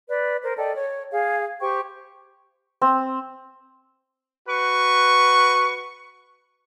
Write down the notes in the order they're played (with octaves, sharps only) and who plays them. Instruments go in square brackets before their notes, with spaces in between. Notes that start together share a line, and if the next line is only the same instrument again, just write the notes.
[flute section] B4 D5
A#4 C5
A4 D5 D#5 G5
C#5
G#4 F5
G4 C5 G5 C#6
[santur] C4
[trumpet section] F#4 B4 C#6